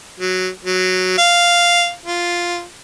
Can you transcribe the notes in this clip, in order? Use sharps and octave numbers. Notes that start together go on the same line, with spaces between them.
F#3
F#3
F5
F4